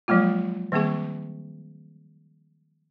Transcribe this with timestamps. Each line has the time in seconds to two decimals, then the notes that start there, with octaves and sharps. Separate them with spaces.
0.08 F3 F#3 G#3 A#3 F4
0.72 D#3 G3 A#3 C4 G#4 C#6